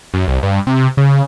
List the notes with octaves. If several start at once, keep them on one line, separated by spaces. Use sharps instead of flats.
F#2
C2
G2
C3
C#3